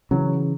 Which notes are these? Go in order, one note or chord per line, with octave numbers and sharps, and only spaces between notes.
C#3 E3 F#3